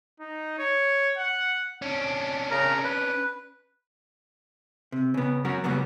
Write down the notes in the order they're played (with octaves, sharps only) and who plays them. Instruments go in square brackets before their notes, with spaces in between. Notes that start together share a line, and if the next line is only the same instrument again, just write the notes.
[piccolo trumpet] D#4
C#5
F#5
[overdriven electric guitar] C#4 D4
[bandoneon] C#3 A#4 A#5
B4
[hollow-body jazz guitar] C3
C#3 B3
F#2 C#4 F#4 A#4
C#3 F#3 G3 A#3 B3